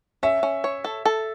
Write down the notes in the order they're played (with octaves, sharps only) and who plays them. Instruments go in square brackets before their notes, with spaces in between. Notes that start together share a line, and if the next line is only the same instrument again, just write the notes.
[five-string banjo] C#4 [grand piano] E5
[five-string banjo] C#4
C#5
A4
A4